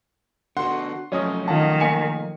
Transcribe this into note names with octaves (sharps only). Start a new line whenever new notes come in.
D3 B3 F#4 F#5 C6
F3 F#3 A3 C#4 C#5 D#5 D#6
D#3 F4 F#5 A5
A#3 G#5 C#7